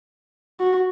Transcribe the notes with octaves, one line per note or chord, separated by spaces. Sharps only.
F#4